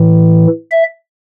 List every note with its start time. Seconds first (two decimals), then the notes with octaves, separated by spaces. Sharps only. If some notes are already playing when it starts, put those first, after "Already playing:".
Already playing: A2 E3
0.71 E5